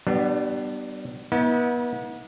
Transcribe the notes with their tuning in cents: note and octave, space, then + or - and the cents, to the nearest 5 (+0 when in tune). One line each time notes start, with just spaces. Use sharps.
G3 -30 B3 +0 D4 +30
B3 -35 D#4 +45